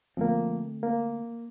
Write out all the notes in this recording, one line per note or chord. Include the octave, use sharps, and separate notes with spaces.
D3 F3 A3 A#3 C4
A#3